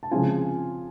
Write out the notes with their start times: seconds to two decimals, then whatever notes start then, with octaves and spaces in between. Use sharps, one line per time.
0.03 A5
0.11 C#3 F3 G#3 C4 F4 G#5